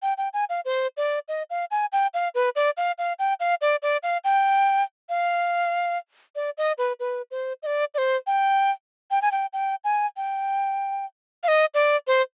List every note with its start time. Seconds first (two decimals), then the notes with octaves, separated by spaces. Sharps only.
0.02 G5
0.18 G5
0.34 G#5
0.50 F5
0.65 C5
0.97 D5
1.28 D#5
1.50 F5
1.71 G#5
1.92 G5
2.14 F5
2.35 B4
2.56 D5
2.77 F5
2.98 F5
3.19 G5
3.40 F5
3.61 D5
3.83 D5
4.03 F5
4.24 G5
5.09 F5
6.36 D5
6.58 D#5
6.78 B4
7.00 B4
7.31 C5
7.63 D#5
7.66 D5
7.94 D5
7.98 C5
8.27 G5
9.11 G5
9.22 G#5
9.32 G5
9.53 G5
9.84 G#5
10.17 G5
11.43 F5
11.48 D#5
11.74 D5
12.07 C5